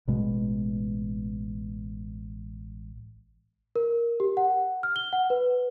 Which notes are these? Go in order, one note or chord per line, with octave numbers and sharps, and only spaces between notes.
A1 B2 G#3
A#4
G4
F#5
F6
G7
F#5
B4